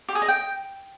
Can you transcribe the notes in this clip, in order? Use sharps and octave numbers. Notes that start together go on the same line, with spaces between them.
G4
G#4
D#5
G5